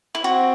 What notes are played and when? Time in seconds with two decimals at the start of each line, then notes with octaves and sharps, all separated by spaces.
0.15 E4
0.24 C4 F#4